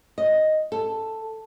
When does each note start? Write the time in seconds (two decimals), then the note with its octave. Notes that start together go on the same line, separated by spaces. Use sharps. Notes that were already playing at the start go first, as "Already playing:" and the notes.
0.18 D#5
0.72 A4